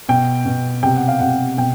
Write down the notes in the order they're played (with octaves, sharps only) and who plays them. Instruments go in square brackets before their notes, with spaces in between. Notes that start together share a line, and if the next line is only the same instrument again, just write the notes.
[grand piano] B2 G5
B2
C3 G5
F#5
F5
C3 F#5
B2 G5